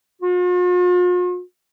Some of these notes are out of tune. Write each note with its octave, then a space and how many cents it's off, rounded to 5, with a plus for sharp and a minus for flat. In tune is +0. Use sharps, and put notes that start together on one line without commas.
F4 +45